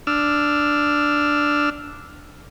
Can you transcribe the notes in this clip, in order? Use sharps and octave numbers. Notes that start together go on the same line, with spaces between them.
D4 E6 F6